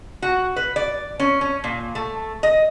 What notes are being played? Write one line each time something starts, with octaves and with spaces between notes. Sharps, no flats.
F#4
B4
D5
C#4
C#4
A#2
A3
D#5